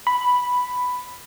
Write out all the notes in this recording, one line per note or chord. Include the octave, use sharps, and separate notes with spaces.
B5